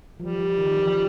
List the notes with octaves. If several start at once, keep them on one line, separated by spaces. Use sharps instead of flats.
F3 G3
F3
D#3
F3